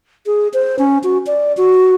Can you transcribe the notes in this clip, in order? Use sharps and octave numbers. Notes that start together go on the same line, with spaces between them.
G#4
C5
C#4
F#4
D5
F#4